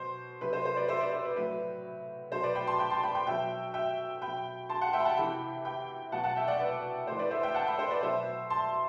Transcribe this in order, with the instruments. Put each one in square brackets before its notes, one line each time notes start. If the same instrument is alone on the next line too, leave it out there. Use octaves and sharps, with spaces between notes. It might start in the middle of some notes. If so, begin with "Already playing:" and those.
Already playing: [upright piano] B2 F#3 C5
C3 F#3 B4
C5
C5
B4 D5
C5 E5
B4 D5
C5
B4
A2 F#3 B4
B2 F#3 C5
B4 D5
G5 B5
A5 C6
G5 B5
A5 C6
G5 B5
G5 B5
B2 F#3 E5 G5
E5 G5
B2 F#3 G5 B5
A5 C6
F#5 A5
E5 G5
B5
F#5 A5
C3 E3 G5 B5
G5 B5
B2 F#3 F#5 A5
F#5 A5
E5 G5
D5 F#5
B4 D5
A2 E3 C5
B4 D5
C5 E5
E5 G5
F#5 A5
G5 B5
C5
B4 D5
B2 F#3 C5 E5
A5 C6